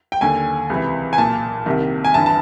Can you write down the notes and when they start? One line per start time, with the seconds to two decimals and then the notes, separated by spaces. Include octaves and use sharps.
0.12 G5
0.21 D#2 D3 G#5
0.70 C#2 C3 E3
1.13 G#5
1.18 B1 A#2 A5
1.66 C2 C3 D#3
2.05 G#5
2.14 G1 G2 E3 A5
2.26 A5